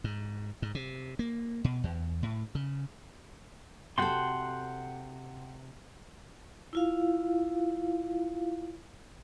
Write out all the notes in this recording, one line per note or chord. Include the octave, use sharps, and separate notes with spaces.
G#2
G#2
C3
A#3
B2
E2
A2
C#3
C3 F#4 A4 F#5 G5 C6
E4 F4 F5